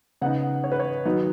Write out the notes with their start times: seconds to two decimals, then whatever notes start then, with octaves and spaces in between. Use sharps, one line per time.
0.21 C#3 B3 D#4 F#5
0.64 C#5
0.72 B4
0.80 C#5
1.05 D#3 F#3 B3 D#4